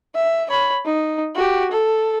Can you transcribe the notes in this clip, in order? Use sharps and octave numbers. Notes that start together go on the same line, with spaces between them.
E5
C#5 B5
D#4
F#4 G4
A4